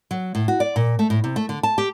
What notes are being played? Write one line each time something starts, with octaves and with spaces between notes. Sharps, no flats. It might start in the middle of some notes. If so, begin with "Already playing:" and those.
F#3
A2
F#4
D5
A#2
A3
A2
C3
A3
D3
A5
G4